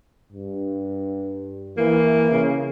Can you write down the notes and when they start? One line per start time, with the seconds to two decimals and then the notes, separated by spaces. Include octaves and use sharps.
0.33 G2
1.78 E3 A#3
2.31 C#3